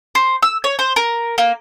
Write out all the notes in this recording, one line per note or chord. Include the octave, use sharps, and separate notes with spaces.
C5
E6
C#5
C5
A#4
A#3